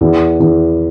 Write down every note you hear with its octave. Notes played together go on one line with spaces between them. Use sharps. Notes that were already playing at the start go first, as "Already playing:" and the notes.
E2
E2